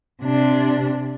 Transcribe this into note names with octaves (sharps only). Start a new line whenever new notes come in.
C3 D4